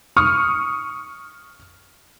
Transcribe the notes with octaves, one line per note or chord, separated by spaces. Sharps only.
C#6 D#6 F6